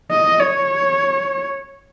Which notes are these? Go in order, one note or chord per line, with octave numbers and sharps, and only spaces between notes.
D#5
C#5